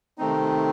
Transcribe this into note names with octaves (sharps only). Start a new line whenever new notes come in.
C3 D#3 A3 C4 D#4